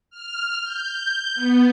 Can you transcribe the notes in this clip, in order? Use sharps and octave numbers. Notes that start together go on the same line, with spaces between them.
F6
G6
B3